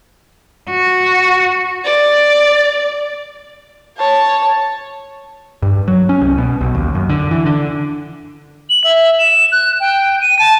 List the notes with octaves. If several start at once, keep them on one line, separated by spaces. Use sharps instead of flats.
F#4
D5
C#5 A5
G2
F#3
C#4
C2
B2
B1
D#2
F#2
D3
E3
D3
F#7
E5
E7
F#6
G5
D#7
A5